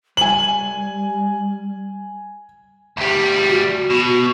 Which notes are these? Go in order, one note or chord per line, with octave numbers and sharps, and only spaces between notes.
G3 G#5 F#7
D2 G3
F#4
B2